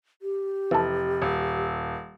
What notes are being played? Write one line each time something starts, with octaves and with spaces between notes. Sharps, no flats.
G4
F1 E3 A4
D#1